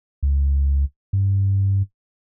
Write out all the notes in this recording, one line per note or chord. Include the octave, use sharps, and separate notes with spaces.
C#2
G2